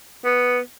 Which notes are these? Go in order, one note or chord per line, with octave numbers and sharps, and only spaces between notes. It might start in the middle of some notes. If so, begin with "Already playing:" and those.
B3